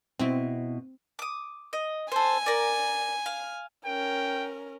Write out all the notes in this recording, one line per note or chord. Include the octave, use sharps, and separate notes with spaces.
B2 C4 E4
D6 D#6
D#5
A4 C5 G#5
A#4 D5
F5
C#4 A#4 G5